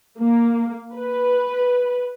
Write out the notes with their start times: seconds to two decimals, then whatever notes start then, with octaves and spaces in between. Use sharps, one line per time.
0.19 A#3
0.94 B4